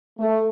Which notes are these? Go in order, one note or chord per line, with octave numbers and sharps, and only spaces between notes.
A3